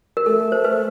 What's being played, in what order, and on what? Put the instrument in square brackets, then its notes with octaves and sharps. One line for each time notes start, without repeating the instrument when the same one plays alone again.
[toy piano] A#4
[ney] A3 [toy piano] A4
[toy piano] C5
B4